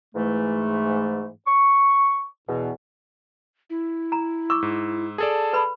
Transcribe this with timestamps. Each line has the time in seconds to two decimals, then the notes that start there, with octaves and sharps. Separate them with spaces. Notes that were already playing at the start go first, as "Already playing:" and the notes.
0.15 G#2 E3 A3
1.47 C#6
2.49 E2 B2
3.70 E4
4.12 A#5
4.50 C#6 D6 E6
4.62 G#2
5.18 G#4 A4 D5 A5
5.53 B4 B5